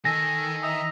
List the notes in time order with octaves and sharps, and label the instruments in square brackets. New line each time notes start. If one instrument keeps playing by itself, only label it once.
[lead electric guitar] D#3 [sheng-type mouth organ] A4 [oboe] G#5 [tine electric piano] A#6
[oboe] D#5 [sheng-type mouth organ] E5 A#5